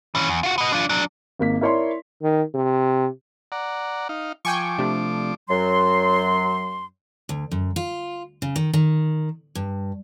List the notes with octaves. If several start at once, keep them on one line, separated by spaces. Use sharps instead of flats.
E3 C#4
E2
F4 F#4
B3 D#5
D4 F4
F#3 D4
G#1 A#3 B6
E4 A#4 C#5 D5 C6
D#3
C3
D5 F#5 A#5
D#4 F5
F3 G5 G#5 C#6 D6
C3 A3 D4
F#2 F#3 C6
D2
F#2
F4
C#3
D#3
D#3
G2